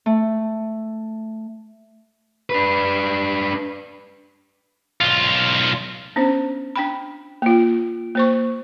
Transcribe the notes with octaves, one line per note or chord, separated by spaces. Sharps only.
A3
D4 B4
B1 F4
B3 C#4 D4 C5
D4 G5 B5
A#3 F4
A#3 C5 C#6